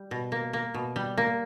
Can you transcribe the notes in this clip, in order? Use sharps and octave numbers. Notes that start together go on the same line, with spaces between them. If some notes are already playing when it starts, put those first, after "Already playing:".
Already playing: G3
B2
A#3
A#3
B2
G3
A#3